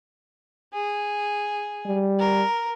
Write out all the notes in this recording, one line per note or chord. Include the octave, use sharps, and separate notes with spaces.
G#4
G3
A#4